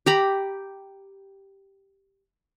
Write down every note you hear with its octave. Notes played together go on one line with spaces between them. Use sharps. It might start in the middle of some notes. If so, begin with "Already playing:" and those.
G4 A#5 B5